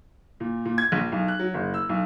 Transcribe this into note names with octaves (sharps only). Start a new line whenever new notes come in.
A#2
A#2
G#6
A#1
B1
F#6
F#3
F#1
E6
B1